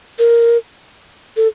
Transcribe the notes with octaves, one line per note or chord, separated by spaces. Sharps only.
A#4
A4